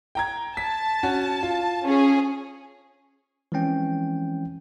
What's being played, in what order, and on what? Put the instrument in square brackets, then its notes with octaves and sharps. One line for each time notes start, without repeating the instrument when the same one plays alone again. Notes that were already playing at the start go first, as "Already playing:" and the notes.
[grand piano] G5 A#5 G#6
[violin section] A5 [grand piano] B6
[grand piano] C#4 F#4
F4
[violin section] C#4 G#4
[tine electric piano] E3 F3 G#3 C4 C#4 G5